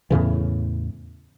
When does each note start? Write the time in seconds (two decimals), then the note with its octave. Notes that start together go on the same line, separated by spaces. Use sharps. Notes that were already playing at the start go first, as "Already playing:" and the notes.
0.11 E2 A2 C#3 E3